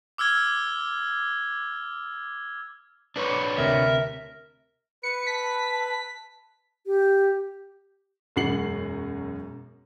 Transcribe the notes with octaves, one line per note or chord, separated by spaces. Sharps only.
D6 E6 F6 G#6 G7
D4 B4 C#5
D2 C3 A#4 E5
B4 C#7
A5 B6
G4
E1 F#2 F#4 C7 C#7 F#7